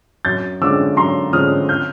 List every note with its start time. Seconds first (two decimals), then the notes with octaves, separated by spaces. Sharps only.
0.25 F#2 G6 A6
0.61 D3 F3 G#3 C#4 D6 E6
0.97 F#2 A#5 C6
1.33 D3 F3 G#3 C#4 D#6 F6
1.69 F6 G6